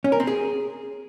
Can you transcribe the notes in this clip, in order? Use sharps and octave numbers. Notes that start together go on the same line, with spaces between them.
C#4
A#4
C4
G#4